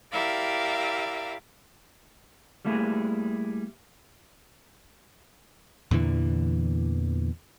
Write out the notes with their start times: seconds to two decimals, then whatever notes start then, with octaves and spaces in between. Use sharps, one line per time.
0.12 E4 G4 A#4 D5 E5 F5
2.65 G3 A3 A#3 E4 G4 G#4
5.91 E2 A#2 D3 E3